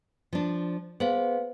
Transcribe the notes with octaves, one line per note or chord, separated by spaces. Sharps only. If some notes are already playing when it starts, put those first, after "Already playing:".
F3 D4
B3 G#4 C5 F5